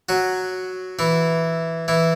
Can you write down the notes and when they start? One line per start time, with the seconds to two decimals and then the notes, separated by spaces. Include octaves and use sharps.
0.09 F#3 F#4
0.99 E3 E4
1.88 E3 E4